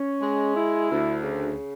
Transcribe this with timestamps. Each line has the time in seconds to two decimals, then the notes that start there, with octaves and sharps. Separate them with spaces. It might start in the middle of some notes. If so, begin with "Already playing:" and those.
Already playing: C#4
0.21 G#3
0.55 E4
0.89 D2
1.23 C#3